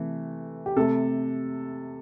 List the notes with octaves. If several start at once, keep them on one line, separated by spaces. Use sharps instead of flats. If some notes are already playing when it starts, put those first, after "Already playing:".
Already playing: C3 E3 A3
G4
C3 A3 A4